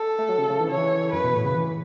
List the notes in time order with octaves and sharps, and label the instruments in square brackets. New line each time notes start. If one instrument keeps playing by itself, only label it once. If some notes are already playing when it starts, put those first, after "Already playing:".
Already playing: [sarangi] A4
[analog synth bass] A3
F#3
C#3
C#3
E3
[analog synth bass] C#3 [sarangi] C#5
[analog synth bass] E3
[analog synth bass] F#2 [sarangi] B4
[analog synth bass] B2
A2
C#3
E3